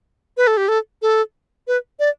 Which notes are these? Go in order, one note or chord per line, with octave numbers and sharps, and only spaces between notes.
B4
A4
G4
A4
A4
B4
D5